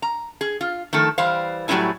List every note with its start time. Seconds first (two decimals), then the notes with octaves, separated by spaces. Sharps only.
0.02 A#5
0.41 G#4
0.61 F4
0.93 D#3 F3 A3 A4
1.18 E3 G3 C5 F5
1.68 A2 F#3 G3 C4 E4 G#5